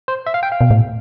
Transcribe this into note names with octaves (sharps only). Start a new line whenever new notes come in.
C5
E5
F5
G5
F5
B2
A2